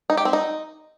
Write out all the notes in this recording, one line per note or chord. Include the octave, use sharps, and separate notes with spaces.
D#4
G4
C4
D#4